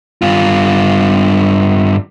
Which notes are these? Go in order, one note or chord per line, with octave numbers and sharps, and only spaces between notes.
G2 F4